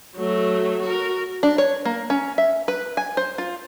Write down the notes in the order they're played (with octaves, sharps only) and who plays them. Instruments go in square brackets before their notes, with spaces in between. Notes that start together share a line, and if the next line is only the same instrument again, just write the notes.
[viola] F#3 A3
F#4 A#4
[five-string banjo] D4
C#5
A#3
C#4
E5
B4
G#5
C5
F4